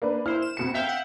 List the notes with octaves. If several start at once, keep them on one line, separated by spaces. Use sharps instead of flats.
A#3 D4 B4
E4 C5 F6
E7
F2 B2 C#7
E5 F5 G5 G6 B6
F#5